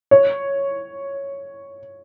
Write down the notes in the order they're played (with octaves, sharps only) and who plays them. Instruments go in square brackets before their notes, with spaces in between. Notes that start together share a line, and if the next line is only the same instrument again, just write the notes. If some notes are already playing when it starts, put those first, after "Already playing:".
[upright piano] C#5